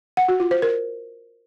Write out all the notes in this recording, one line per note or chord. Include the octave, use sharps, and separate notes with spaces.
F#5
F#4
F4
C5
A#4